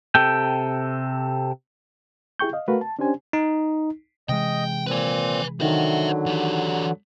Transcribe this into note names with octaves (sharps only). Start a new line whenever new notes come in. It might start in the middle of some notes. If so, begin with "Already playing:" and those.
C3 A4 G5
E4 G4 G#4 G5 C#6 G6
D#5 F5
A3 F#4 A#4 B4 F5
A5
C#4 D4 G4 C5 G#5
D#4
C3 E3 G#3 D#5 G5
A#2 C4 B4 G#5
D3 D#3 F#3 C5 E5
E3 G4